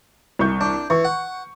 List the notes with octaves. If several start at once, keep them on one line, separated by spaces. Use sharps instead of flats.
C2 C#6 G6
D4
E3 C#6
F#5